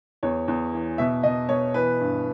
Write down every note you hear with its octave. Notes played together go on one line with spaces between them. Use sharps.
E2 C#5
E2
E3
B2 E5
B2 D#5
B2 C#5
E3 B4
G2